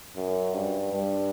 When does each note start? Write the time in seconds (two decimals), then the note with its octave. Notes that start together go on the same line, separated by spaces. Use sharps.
0.16 F#2
0.54 G2
0.92 G2